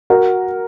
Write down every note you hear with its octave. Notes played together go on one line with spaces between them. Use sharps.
F#4 A#4